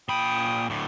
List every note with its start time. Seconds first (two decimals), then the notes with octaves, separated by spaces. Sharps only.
0.09 A#2 G5 B5 D#6
0.70 D2 A2